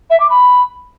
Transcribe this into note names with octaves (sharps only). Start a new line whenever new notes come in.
E5
D6
B5